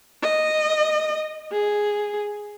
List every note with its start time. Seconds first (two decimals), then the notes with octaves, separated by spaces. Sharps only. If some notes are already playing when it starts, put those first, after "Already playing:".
0.23 D#5
1.52 G#4